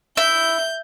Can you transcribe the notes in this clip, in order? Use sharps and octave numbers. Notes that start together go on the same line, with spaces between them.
E4 G6